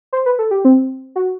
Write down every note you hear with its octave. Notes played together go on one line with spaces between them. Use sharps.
C5
B4
A4
G4
C4
F#4